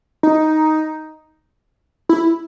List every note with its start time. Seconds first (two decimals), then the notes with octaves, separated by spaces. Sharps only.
0.23 D#4
2.09 E4